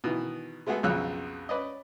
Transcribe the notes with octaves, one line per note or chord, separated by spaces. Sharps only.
B2 D#3 E3
G#3 A3 B3 F#4 G#4 A4
B1 F2 C#3 C#5 E6 F#6
C#4 B4 D5 D#5